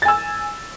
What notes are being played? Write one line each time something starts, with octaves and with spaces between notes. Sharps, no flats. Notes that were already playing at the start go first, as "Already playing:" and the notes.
G#5 E6 A6